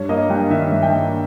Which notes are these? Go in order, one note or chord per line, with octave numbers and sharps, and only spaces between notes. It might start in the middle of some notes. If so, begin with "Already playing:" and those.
Already playing: G2 C#5
A#3 D#5
G2 G5
D#3 E5
G2
G5
A#3